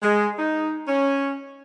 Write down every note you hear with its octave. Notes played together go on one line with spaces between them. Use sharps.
G#3
D#4
C#4